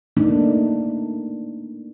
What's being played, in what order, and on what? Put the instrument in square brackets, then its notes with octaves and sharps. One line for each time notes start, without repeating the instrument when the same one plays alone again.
[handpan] A3 A#3 D4 D#4